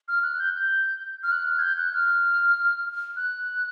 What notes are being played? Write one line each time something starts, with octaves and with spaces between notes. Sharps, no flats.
F6
F#6
G6
G6
F6
F#6
F6
G#6
G6
F#6
F6
F#6